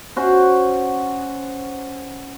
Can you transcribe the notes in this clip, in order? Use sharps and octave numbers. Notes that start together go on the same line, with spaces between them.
C#4 F#4 C5